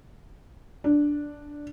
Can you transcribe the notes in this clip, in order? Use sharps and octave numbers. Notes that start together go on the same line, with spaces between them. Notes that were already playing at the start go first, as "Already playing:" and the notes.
D4